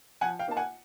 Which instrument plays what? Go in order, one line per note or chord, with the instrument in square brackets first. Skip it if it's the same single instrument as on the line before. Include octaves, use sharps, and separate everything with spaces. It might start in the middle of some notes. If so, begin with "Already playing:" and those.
[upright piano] F3 F#5 G#5
F5 G5
A#3 D#4 A5
F#5 G#5